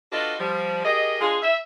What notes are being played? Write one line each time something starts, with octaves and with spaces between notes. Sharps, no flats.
D4 F4 F#4 A4 B4 D#5
F3 G3
G4 G#4 A#4 D#5
G#3 D4 F4 G#4
E5